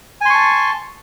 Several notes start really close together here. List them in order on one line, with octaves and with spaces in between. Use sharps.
G#5 C6 C#6 A5